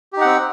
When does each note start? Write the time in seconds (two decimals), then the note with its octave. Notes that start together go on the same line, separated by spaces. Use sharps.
0.13 G4
0.17 D#4
0.21 F#5
0.25 C4